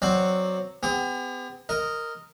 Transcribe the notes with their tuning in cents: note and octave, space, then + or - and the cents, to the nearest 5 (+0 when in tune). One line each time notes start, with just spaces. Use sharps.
F#3 +0 C4 +0 D5 +20
B3 +45 G4 +45
A#4 -10 D#5 +0